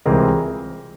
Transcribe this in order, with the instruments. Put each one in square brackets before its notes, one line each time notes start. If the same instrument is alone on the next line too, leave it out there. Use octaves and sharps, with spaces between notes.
[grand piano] C#2 C3 E3 G3 C4 G#4 A#4